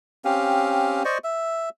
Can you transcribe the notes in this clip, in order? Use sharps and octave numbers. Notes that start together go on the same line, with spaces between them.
C4 C#4 G4 F5
C5 D5 D#5 C#6
E5